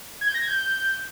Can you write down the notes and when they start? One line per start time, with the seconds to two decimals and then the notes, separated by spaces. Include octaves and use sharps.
0.21 G#6
0.28 G6
0.35 A#6
0.41 G#6
0.48 G6